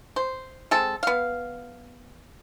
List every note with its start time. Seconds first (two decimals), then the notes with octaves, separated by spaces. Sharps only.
0.16 C5
0.71 G#3 C4 A4
1.03 B3 F5